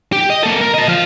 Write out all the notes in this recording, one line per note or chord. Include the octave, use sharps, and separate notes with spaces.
G4
D#5
A#3 A4
A#4
D#5 A5
F3 F5